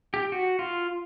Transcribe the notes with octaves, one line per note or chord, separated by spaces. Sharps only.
G4
F#4
F4